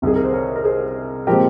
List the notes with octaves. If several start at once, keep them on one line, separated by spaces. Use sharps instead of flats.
C2 C3 D#3 G#4
A#4
C5
A#4 C#5
A#4
G#4 C5
A#2 F3 G#3 C4 G4 A#4